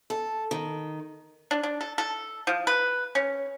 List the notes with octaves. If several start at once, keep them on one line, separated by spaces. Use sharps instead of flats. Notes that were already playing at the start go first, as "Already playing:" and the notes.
A4
D#3
D4
D4
A4
A4
F3
B4
C#4